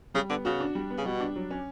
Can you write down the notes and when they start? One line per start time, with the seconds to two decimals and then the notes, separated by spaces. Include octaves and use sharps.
0.14 C#3 G3
0.29 D3 B3
0.45 C#3 F#4
0.60 D4
0.75 G3
0.90 B3
0.97 C#3
1.05 B2 G3
1.20 D4
1.36 F#3
1.51 C#4